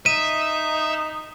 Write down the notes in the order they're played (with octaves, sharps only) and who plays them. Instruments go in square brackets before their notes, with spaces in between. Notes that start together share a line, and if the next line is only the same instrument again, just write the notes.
[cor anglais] D#4 [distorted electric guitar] E5 [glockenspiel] D#7